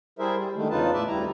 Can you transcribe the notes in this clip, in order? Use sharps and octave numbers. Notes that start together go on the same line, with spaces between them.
G3 E4 G#4 A#4 C5 E5
G3
D3 D#3 G#3 A3
E2 C#3 D#4 F4 B4 A5
A2 B4 D5 E5 A5
D2 G3 E4 A#5